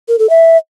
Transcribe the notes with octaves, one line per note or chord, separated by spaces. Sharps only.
A#4
A4
E5